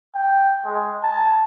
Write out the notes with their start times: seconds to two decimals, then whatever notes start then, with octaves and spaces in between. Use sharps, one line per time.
0.15 G5
0.65 G#3
1.03 A5